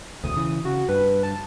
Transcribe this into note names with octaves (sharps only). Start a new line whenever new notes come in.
E1 D2 D#6
C#3 E3
C#3 F#4
G2 B4
A5